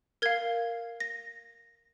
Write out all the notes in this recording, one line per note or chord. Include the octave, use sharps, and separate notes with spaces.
A#4 F5 G#6
A#6